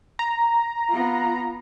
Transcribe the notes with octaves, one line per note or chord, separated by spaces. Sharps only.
A#5
B3 F4